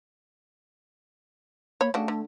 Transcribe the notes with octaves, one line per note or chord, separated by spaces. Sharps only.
A#3 C#5 B5
C#3 A3 D4 F#4
D3